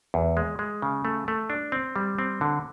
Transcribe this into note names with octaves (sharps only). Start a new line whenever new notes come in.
E2
G#3
G#3
C#3
A3
A3
D4
C4
G3
C4
D3